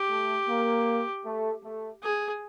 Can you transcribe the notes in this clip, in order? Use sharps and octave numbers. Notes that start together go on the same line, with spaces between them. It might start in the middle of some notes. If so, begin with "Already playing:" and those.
Already playing: G4
A3
A#3
A3
A3
G#4